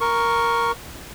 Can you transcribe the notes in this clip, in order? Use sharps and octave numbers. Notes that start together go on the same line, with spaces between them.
A#4 C#6